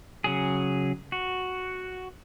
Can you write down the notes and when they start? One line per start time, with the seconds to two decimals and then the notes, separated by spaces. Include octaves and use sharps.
0.24 C#3 F#3 G#4
1.12 F#4